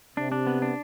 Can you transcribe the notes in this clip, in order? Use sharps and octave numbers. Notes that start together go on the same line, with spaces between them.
C3 D4
D4
B3
D4